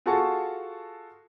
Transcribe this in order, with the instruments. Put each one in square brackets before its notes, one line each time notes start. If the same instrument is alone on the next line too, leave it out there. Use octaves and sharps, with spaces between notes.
[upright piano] F4 F#4 G#4 A4 A5 C#6